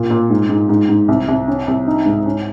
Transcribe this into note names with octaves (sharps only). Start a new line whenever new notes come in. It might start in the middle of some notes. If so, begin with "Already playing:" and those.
Already playing: A#2
A#2
G#2
G#2
G#2
G#2
C2
C2
C#4
C2
D#4
G#2
C#4